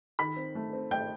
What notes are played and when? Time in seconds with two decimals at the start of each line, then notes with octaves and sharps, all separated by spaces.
0.19 D#3 B5 B6
0.36 C4
0.55 A3
0.73 C4
0.91 A3 G5 G6